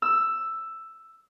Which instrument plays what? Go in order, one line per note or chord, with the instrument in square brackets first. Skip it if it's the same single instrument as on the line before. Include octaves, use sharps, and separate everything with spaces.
[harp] E6